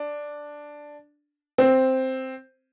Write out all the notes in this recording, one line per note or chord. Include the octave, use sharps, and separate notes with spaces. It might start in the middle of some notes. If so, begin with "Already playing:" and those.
Already playing: D4
C4